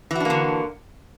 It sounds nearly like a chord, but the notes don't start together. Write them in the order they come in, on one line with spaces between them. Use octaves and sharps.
E3 F#4 D4 A#3 D3